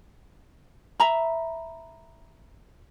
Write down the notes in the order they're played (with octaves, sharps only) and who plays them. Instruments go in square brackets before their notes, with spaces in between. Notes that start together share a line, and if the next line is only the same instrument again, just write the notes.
[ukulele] E5 A#5 B5